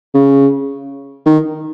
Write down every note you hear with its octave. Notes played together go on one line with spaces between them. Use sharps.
C#3
D#3